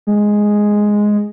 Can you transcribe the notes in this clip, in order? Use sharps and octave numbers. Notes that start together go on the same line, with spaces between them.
G#3